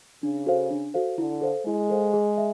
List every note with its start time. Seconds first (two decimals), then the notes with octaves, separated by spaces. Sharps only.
0.23 C#3 D4
0.46 F#4 A4 C5 F5
0.71 D4
0.94 F#4 A4 C5 F5
1.18 D3 E4
1.42 A4 C5 F5
1.66 G#3 E4
1.90 A4 C5 F5
2.14 G#4
2.38 E5